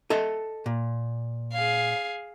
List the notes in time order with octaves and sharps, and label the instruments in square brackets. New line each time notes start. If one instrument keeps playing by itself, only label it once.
[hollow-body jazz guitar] A4 D#5 E5
A#2
[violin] G#4 F5